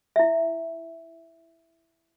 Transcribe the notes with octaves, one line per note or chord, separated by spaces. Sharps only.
E4 E5